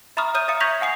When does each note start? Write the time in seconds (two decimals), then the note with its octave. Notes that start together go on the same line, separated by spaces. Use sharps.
0.17 E5 A#5 B5 C#6 D#6 F6
0.34 C#5 D#6 F6 G6 D#7
0.48 E5 F5 A#5 D#6 C#7
0.60 C#6 G6 G#6 A#6 B6 F7
0.80 F5 F#5 G#5 D#6 C7